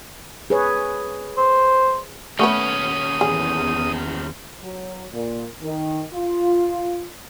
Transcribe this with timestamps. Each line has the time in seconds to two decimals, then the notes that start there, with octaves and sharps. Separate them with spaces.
0.50 G#4 B4 C#5
1.37 C5
2.39 D#2 A3 B3 C#4 B4 D#6
3.21 E2 G#4
4.62 F#3
5.12 A#2
5.62 D#3
6.13 F4